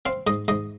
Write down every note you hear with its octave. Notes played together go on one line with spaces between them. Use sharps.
C4 F5
G#2 D#5
G#2 D#5